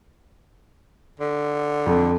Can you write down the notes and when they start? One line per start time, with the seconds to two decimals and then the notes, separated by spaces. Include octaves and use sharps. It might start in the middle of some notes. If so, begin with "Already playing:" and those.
1.19 D3
1.86 F2